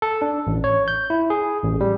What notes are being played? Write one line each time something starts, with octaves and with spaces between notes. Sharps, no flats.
A4
D4
A1
C#5
G6
E4
G#4
A1
G3